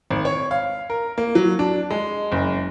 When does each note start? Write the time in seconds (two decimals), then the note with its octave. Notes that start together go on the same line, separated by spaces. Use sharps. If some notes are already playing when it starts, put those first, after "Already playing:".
0.11 G#1
0.25 C#5
0.51 F5
0.90 A#4
1.18 A#3
1.35 F#3
1.59 D4
1.90 G#3
2.32 F#1